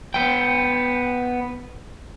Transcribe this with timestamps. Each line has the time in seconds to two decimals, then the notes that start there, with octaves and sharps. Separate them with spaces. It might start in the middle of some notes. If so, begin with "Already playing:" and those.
0.14 B3 G5